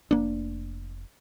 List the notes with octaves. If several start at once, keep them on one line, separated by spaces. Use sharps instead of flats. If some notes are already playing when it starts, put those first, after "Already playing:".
F1 A#3 D4